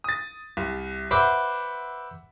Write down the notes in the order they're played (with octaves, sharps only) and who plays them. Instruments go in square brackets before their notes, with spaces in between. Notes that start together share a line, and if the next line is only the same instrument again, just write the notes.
[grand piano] D#6 A6
C2
[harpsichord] B4 C5 D6 [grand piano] E5 F#5